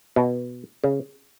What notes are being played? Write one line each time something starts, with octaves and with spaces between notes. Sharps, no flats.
B2
C#3